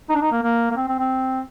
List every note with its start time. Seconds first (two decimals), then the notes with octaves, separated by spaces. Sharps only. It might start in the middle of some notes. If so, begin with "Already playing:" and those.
0.10 D#4
0.15 D4
0.21 D#4
0.32 A#3
0.43 A#3
0.71 A#3
0.76 C4
0.89 C4
0.99 C4